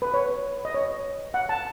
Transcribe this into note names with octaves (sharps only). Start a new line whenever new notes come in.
B4
C#5
D#5
C#5
F#5
A5